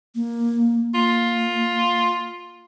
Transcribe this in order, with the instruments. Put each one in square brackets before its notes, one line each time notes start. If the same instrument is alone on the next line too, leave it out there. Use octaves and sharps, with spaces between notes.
[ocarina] A#3
[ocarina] A#3 [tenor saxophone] F4